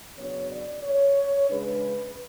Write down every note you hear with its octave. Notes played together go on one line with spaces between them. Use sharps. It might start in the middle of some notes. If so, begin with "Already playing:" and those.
C#3 F#3 B3 D4 C#5
D5
C#5
C#3 G#3 D4 B4